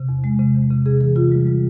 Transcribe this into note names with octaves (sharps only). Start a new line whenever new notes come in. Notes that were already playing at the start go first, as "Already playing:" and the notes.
Already playing: C3
E2
G#3
C3
E2
C3
C3 G#4
E3 G#4
C3 F4
G3
G3